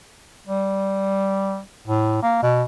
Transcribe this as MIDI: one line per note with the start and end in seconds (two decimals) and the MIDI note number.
0.47 1.60 55
1.87 2.21 45
2.22 2.41 58
2.43 2.63 47